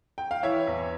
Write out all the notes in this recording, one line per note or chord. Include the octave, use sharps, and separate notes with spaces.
G5
F5
E3 C#5 E5
E2